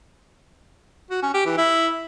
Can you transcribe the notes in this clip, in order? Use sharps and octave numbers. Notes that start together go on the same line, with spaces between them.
F#4
C#4
G4
E3
E4